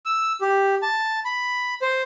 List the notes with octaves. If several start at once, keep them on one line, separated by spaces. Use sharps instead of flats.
E6
G4
A5
B5
C5